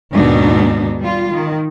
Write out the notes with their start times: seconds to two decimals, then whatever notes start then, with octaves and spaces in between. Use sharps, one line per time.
0.12 D#2 G#2 B2 D4 D#4
0.99 G3 F4
1.32 D#3